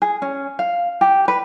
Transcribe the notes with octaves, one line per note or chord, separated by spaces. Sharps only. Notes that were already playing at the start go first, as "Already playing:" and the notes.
G#4
C#4
F5
G4
B4